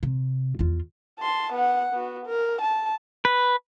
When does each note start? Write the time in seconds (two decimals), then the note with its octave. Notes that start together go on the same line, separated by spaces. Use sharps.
0.03 C3
0.59 E2 F4
1.19 A5 C6
1.53 B3 F#5
1.93 B3 F#4
2.26 A#4
2.61 A5
3.25 B4